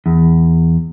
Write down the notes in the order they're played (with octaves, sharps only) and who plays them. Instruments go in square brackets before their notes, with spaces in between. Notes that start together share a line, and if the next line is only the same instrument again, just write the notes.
[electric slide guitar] E2